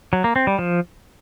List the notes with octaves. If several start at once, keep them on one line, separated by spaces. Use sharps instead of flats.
F#3
A#3
C4
G3
F3